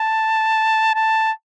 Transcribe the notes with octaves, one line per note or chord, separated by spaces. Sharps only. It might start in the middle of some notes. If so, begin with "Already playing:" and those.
Already playing: A5
A5